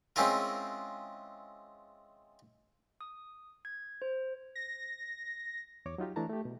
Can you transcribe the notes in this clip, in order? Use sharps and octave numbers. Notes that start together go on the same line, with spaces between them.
G#3 C4 C#4 E4 F4 A#4
D#6
G#6
C5
A#6
E2 C#5 D6
F#3 D#4 F4 G4
E3 A3 D4 E4 A5 A#5
A3 G4
B2